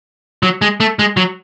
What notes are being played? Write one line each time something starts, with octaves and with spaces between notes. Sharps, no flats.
F#3
G#3
A3
G#3
F#3